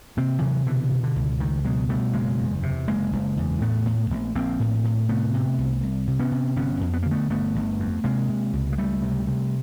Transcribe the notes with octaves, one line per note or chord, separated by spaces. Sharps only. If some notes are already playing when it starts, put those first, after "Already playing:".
C3 A#3 C4
C3 E3 F#3
B2 D3 E3
B2
D3
C#2
C#2 D#3
B2 F#3 G#3
B2 G3 A3
F#1 G#3 A#3
E2
C3
F#1 G#3 A#3
F#1
E2
A2 A3 B3
A2
A#1
A#1 A#3 C4
A2
A2
C3 A3 B3
C3
C2
C2
C3
B3 C#4
C3
G1 B3 C#4
F2
B3
D3 A#3
A3 B3
G1 A3 B3
G1
F2
C3 G#3 A#3
C3
C#2
G#3
C#2 G3 A3
C3
C3